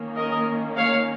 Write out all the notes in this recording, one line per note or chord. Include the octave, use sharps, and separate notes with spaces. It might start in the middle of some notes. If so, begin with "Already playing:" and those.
Already playing: D#3 A#3 C#4
A#4 D#5
C#5 F5